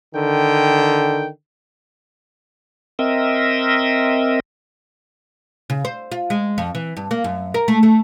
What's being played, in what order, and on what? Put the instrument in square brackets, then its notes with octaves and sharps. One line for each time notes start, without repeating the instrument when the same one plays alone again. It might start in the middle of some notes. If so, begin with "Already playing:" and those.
[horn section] D3 D#3 G5
[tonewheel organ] C4 A#4 D#5 E5
[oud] C#3
C5
F4
G#3
F2
E3
G2
A#3
F#2
A#4
A3
A3